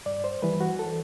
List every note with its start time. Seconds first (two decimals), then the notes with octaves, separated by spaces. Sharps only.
0.06 G2 D5
0.24 C5
0.42 E3 G3 B4
0.60 F#4
0.79 A4